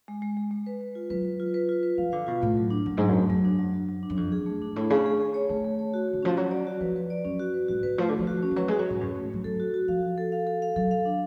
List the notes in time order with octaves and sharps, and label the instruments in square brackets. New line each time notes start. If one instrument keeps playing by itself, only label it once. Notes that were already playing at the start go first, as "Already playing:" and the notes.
[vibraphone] G#3
G#3
G#3
G#3
B4
B4
F4
[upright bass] F#3 [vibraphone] B4
[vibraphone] B4
F4
B4
F4
B4
[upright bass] F3 [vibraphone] F5
[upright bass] D3 [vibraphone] F5
[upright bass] B2 [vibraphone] F4
[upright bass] A2 [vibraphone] A3
[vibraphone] F#3
D4
[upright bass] F#2 [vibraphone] F#3
[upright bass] G#2 [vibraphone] F#3
[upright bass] F#2
[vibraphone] A3
[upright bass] F#2 [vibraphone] F#3
[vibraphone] D4
F#3
F#3
F#3
D4
[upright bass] F#2
[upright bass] F2 [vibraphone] D4
[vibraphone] G#4
[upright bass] F#2
[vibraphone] A3
[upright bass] G#2 [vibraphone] D4
[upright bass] A2 [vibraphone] A3
[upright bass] C#3 [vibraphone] G#4
[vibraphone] G#4
G#4
C#5
[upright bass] D3 [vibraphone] A3
[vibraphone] A3
C#5
F#4
[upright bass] D3 [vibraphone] F#4
[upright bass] F3 [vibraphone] C#4
[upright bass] F#3 [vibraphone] C#4
[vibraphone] D5
F#4
[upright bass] F3 [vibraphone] B4
[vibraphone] B4
D5
[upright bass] F#2 [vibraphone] C#4
[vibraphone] F#4
B4
[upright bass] G#2 [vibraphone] F#4
[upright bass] D3 [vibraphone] B4
[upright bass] F3 [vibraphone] A3
[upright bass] D3 [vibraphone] A3
[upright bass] F3
[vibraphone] F#4
C#4
[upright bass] F3
[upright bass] F#3 [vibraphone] B4
[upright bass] G#3 [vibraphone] F#4
[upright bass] F#3
[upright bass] G#2 [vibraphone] C#4
[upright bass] F#2 [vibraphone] C#4
[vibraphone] A3
[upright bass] G#2
[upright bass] F#3 [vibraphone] A3
[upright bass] F#3 [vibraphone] A4
[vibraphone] F#4
F#4
[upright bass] F3 [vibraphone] F5
[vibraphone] F#4
A4
F5
A4
F5
[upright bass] F#3 [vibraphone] A4
[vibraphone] F5
D4